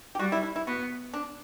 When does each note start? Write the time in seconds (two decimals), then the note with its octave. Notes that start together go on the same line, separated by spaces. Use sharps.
0.15 G4
0.19 G3 F#4
0.32 E4
0.43 E4
0.56 E4
0.67 B3 F#4
1.14 D4